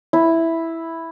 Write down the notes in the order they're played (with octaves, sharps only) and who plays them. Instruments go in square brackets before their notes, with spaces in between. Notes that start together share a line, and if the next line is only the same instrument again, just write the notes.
[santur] E4